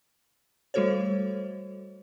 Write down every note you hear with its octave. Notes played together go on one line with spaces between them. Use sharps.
G3 A3 F#4 A4 C5 C#5